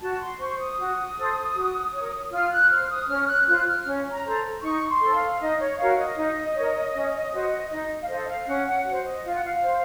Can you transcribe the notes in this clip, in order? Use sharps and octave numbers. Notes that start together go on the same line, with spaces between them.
F#4 A5
C6
C5 C#6
D#6
F#4
A4 C5
F#4
A#4 C#5
F4 F6
F#6
C5 F6
D#6
C#4 F6
F#6
F4 C5 F#6
F6
C#4
A#5
A4 C5
D#4 C#6
C6
A4
C5
F5
D#4 D#5
C#5
F#4 A#4 C#5 F5
D#5
D#4
A#4 C#5
C#4
F#4 C5
D#4 D#5
F5
A4 C5 D#5
F5
C#4 F#5
F#5
F#4 C5 F#5
D#5
F4 F5
F#5
F5
C5